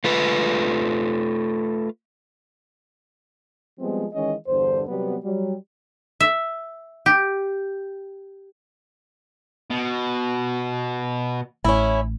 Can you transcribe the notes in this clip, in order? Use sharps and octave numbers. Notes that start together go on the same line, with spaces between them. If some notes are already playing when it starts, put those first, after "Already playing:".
A3 F4 B4
F3 G3 G#3 B3 C4
D#3 E3 G#3 C#4 D#5
E2 G2 D3 C5
C3 F#3 G3 B3
F#3 G3
E5
G4
B2
A1 C#4 E4